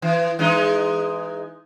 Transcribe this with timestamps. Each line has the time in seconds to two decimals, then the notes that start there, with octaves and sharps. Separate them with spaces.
0.02 E3
0.39 E3 G#3 D#4